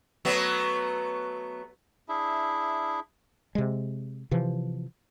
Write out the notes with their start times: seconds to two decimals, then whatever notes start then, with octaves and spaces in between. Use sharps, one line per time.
0.25 F#3 A3 B3
2.09 D4 E4 G#4 E5
3.55 C3 G#3
4.31 C3 E3 F3